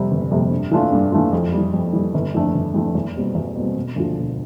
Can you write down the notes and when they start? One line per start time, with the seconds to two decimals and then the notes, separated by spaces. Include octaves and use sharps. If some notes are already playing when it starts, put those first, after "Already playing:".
Already playing: F2 C3 G3
0.11 G1
0.31 F2 C3 G3
0.51 G2
0.71 E3 A3 D4 F4
0.92 G2
1.12 E3 A3 D4 F4
1.33 F2
1.52 G3
1.58 E3
1.73 F2
1.93 E3 G3
2.14 G1
2.34 F2 E3 A3 D4
2.54 G1
2.74 F2 E3 A3 D4
2.95 E2
3.15 B2 G3 C4
3.35 E2
3.55 B2 G3 C4
3.76 E1
3.96 D2 D3 F3
4.17 E1